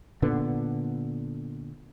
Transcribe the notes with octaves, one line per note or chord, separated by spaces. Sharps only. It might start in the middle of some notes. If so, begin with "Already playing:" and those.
A#2 D3 B3